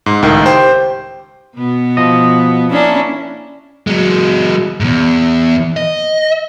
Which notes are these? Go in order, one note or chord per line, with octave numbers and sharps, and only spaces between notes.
G#2
C#2 A2 D#3
G4 C5 G5
B2 B3
F3 D#5
A#3 C#4 D4 E4
F#3 G#3
E2 G#2
D#5